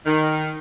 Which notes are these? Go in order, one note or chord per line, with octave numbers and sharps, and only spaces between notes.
D#3